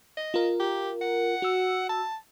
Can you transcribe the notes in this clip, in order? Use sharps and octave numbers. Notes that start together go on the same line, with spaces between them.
D#5
F4 A#4
G4
F#5
F#4 E6
A5